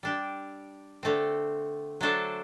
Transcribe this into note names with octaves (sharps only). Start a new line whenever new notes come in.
G3 D4 G4
D3 A3 C4
F#3 A3 D4 A4 C5